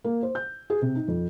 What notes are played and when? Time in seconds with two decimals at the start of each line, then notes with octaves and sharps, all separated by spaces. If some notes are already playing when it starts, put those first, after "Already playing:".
0.04 A#3
0.23 C5
0.35 G6
0.70 G#4
0.82 C3
0.95 D#4
1.08 F2